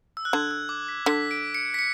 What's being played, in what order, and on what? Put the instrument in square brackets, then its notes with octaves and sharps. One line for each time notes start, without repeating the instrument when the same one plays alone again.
[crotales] E6
F#6
[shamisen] D3 [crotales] G#6
[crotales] E6
D6
B6
[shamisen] D3 [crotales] B6
[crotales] D7
C#7
B6
C#7